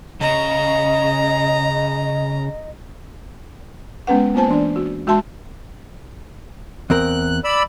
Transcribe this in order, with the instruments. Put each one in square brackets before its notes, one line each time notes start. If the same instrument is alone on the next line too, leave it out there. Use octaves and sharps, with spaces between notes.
[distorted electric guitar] C#3 [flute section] D#5 [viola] A#5
[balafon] G#3 B3 C#4 B4 F#5
A#3 B3 F4 C5 G#5 A5
E3 D4 D5
F#4
G#3 F#4 E5 A5 C6
[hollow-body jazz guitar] E2 C4 A#4 [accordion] F#6
[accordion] D5 B5 E6